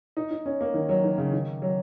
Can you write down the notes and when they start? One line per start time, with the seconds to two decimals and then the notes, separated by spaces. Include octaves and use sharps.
0.17 D#4
0.31 D#4
0.46 C#4
0.61 A#3
0.74 D#3
0.89 F#3
1.04 D#3
1.18 C#3
1.33 D#3
1.62 F#3